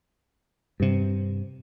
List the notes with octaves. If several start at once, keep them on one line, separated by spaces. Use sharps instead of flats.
G2 C3